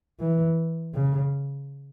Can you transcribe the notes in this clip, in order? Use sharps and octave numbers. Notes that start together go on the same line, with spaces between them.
E3
C#3